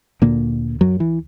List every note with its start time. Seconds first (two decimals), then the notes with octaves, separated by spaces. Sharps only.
0.22 D2 A#2 D3 A#3
0.81 F#2 F#3
1.00 E3